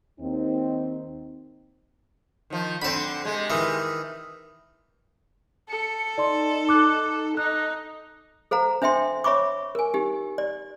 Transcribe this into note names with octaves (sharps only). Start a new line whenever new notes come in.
D#2 C4 D#4
D#3 F3
D3 C4 A5 B5
C3 G#3
D#3 E3
A4 C#7
D#4 D5 C6
D6 F#6
D#4 F#6
A4 C5 F5 A#5
D4 C5 E5 G5 C6
C#5 E5 B5 C#6 D6
A#4 G#5
D#4 G4
D5